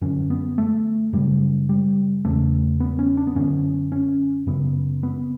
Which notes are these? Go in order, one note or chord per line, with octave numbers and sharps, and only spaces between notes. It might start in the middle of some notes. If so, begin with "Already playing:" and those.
F#2 D3 C#4
B3
A3
F#2 C#3 G3
G3
E2 C#3 A3
B3
C#4
D4
B3
F#2 D3 C#4
C#4
F#2 C#3 B3
B3